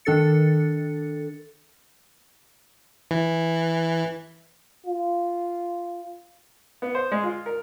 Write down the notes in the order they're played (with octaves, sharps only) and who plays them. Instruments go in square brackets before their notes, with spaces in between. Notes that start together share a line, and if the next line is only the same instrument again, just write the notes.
[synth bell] D#3 D4 A4 A6 C#7
[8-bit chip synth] E3
[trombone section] F4
[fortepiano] B3
C5
G#3
F4
A#4